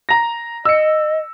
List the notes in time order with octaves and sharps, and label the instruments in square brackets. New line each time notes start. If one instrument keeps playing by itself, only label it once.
[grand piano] A#5 A#6
[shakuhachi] D#5 [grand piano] E6 C#7